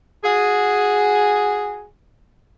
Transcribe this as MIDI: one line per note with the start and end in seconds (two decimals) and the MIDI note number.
0.23 1.85 66
0.23 1.85 68